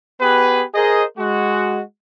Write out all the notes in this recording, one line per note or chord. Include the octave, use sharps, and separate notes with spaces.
B3 G4 G#4 B4
G#4 A#4 C5 D#5
G#3 F#4